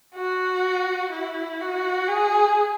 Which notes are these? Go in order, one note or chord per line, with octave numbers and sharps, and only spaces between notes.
F#4
E4
F#4
G#4